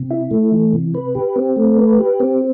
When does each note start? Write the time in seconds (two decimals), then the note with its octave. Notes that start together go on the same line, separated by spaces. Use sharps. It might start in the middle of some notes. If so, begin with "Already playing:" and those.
Already playing: C3
0.11 E4
0.31 A3
0.52 E3
0.74 C3
0.94 B4
1.15 G4
1.36 C4
1.56 A3
1.78 B4
1.99 G4
2.20 C4